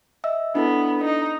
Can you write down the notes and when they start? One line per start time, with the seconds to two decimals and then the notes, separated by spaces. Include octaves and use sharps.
0.24 D#5 E5 E6
0.55 B3 D4 E4 A4
1.04 D#4